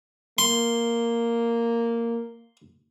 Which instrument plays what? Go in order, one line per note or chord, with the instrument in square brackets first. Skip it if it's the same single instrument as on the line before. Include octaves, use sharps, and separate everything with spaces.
[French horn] A#3 [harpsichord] C6